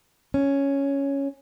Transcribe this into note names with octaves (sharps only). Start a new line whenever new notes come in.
C#4